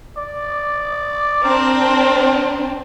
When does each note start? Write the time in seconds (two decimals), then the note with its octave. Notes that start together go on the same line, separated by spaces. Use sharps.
0.18 D5
1.44 C4 D4 A#4